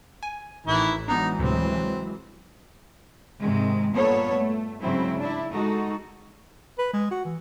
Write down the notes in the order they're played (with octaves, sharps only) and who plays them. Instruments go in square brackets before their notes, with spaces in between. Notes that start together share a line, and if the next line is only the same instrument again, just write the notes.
[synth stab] G#5
[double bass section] A1 [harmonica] D#3 E3 E4
[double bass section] E3 F#3 G#3 [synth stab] B3 D4 [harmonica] D#4
[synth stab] D2 A2 C3 [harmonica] C4
[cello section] G#2 C3 D#3 G#3
G2 A#2 A#3 B3 A4 C#5
A3
G#2 C#3 F#3 C4 E4
D4 E4
G#3 D#4 F#4 A4
[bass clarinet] B4
G#3
F#4
E3